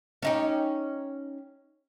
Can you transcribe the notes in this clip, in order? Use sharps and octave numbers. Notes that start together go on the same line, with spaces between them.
C#4 D#4 G4